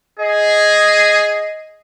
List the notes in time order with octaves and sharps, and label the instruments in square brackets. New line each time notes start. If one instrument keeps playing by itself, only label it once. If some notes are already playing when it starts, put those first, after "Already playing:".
[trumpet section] G#4 [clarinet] D#5